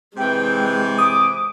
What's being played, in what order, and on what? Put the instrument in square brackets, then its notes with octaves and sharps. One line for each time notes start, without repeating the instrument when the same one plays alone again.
[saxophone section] C3 E3 [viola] G#3 [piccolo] G5
[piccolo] D6 [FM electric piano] D#6